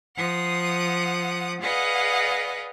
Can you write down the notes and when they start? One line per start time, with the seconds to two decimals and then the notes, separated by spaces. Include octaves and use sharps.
0.15 F3 F#5 D#6
1.61 G#4 B4 D5 D#5 F5 F#5